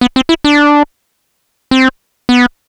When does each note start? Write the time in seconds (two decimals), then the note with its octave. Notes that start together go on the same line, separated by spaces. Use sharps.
0.01 B3
0.16 C4
0.29 E4
0.44 D4
1.71 C4
2.29 B3